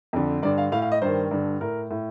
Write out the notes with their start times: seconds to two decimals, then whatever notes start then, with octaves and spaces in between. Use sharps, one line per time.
0.13 F2 D3
0.43 G2 D3 D5
0.58 F5
0.72 A2 F5
0.82 F5
0.92 D#5
1.02 G2 D#3 C5
1.31 G2 D3
1.61 A2 A#4
1.91 A2